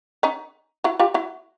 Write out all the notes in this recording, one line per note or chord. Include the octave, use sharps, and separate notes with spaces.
C#4 D#4
E4 F#4
F4 G4
E4 F#4